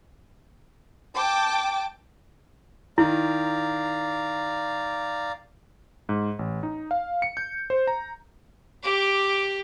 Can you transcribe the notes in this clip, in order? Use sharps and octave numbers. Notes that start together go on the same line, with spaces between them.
G5 A5 D6
D#3 E4 D5 F5 A#5
G#2
A1
D#4
F5
C#7
G6
C5
A#5
G4 D6